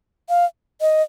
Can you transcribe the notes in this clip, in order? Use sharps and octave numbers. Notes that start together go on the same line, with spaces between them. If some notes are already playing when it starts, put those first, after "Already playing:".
F5
D#5